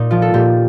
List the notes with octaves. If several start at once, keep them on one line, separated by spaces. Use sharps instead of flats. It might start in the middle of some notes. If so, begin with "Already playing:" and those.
Already playing: A#2 D#4
F3 F4
A4
A#2 G4